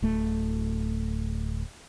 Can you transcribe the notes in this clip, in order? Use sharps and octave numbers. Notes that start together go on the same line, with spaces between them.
D1 A3